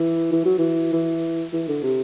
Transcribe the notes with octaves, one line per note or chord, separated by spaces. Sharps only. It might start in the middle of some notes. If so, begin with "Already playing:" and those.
Already playing: E3
E3
F#3
E3
E3
E3
D3
C3